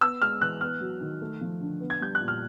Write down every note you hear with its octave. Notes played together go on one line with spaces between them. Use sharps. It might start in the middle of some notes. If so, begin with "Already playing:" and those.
B3 E6
G#3 F6
E3 F#6
B3 F6
F#3
D#3
A3
F3
D3
B3
G#6
G3 G6
F#6
A#2
F6